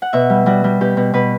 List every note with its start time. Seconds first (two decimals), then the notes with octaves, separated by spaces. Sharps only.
0.02 F#5
0.13 B2 E5
0.30 G3
0.46 G3 F#4
0.64 G3
0.81 B2 G4
0.97 B2
1.14 B2 B4